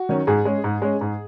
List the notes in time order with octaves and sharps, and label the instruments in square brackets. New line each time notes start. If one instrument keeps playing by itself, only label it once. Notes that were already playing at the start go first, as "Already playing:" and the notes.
Already playing: [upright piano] F#4
D#3 F#3 C#4
G#2 G#4
G#3 C#4
G#2
G#3 C#4
G#2